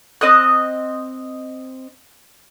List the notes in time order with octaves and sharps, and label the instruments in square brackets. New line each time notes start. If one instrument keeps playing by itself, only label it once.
[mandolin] C4 D#5 D#6 F#6